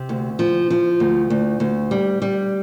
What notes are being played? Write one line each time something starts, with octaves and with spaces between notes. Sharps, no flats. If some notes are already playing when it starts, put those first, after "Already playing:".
Already playing: C3
D2
F3
F3
D2
D2
D2
G3
G3